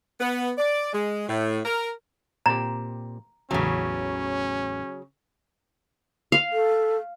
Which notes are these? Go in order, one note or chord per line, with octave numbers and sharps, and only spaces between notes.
B3
D5
G#3
A2
A#4
A#2 C4 G4 A#5
A1 E2 C#3 F#3 C#4 A5
F5
A4